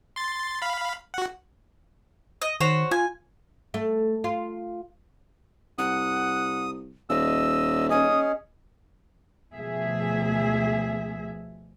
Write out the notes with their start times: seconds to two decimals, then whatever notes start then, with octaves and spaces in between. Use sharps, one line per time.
0.16 C6 A6
0.62 F5 B5
1.14 F#4 F#5
2.42 D#5
2.60 D#3 F#4 C5 C#5
2.91 F4 G#5
3.74 A3
4.24 F4
5.78 C2 F#5 D#6
7.10 D#1 D#5 E6
7.90 C#4 G#4 D#5 D#6
9.53 D2 B2 F3 A3 G#4 E5